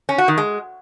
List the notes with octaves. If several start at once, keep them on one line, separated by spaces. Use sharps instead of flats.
C#4
F#4
D#3
G#3